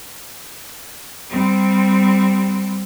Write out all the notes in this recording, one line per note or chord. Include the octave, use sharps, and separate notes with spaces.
G3 C4